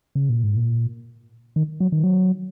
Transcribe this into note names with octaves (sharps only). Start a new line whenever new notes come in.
C#3
A#2
G#2
A#2
D#3
F#3
D#3
F#3